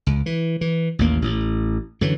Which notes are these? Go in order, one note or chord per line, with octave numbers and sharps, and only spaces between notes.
C#2
E3
E3
A1 D#2 A#3
A1
F#2 D3 E3 F#3